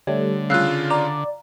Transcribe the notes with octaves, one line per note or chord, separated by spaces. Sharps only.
D3 G3 A3 C#5
C#3 F4 F5 E6 F#6
D5 A#5